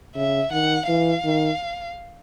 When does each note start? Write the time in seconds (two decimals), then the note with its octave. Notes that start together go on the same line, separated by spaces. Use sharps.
0.16 C#3 E5
0.52 D#3 F#5
0.88 E3 F5
1.25 D#3